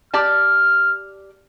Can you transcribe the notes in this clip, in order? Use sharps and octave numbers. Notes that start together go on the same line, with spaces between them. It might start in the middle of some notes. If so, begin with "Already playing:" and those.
G4 D5 A5 F6